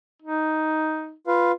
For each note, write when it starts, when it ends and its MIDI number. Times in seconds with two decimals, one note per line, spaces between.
0.22 1.14 63
1.27 1.52 65
1.27 1.52 71
1.27 1.52 77